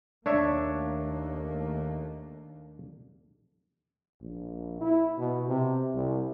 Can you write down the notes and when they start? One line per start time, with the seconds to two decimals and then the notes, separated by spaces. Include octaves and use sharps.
0.26 D#2 A3 A#3 D4 C#5 E5
4.22 A#1
4.81 E4
5.18 B2
5.49 C3
5.95 C2